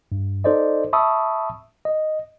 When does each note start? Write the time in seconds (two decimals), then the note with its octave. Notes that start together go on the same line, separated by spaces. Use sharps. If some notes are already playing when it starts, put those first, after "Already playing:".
0.12 G2
0.44 D#4 A4 C5 D5 D#5
0.93 E5 A5 B5 C#6 D#6 E6
1.85 D#5